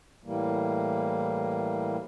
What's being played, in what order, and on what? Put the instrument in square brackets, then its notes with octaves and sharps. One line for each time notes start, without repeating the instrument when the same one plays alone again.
[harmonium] A2 E3 G3 A#3